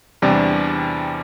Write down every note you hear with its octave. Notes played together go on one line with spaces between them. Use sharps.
E2 C3 G3 D4